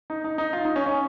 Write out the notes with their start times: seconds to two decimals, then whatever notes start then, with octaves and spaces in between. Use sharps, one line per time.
0.10 D#4
0.24 D#4
0.38 D#4
0.53 F4
0.65 D#4
0.76 C#4
0.86 C#4